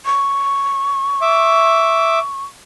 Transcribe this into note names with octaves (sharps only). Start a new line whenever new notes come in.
C#6
E5 D6